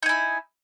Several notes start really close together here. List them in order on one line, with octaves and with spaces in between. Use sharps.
D#4 G#5 E4